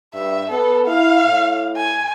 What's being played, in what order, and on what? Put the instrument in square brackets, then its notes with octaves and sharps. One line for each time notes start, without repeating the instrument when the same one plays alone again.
[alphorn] G2 [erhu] E5
[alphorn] B3 [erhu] A4
[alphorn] E4 [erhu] F5
[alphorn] A2
[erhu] G#5